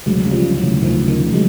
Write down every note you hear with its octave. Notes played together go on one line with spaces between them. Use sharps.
D2 F#3 G#3
C#3
F3 G3
C#3
E3 F#3
D2
D2 D#3 F3
C#3
D#3 F3
D2
F#3 G#3